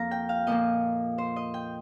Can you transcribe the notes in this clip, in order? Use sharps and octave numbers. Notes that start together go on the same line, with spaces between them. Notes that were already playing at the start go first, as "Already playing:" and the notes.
Already playing: F2 F3 A#3 F5 A#5
G5
F5
A#2 F3 A#3 D#5
C5
D#5
G5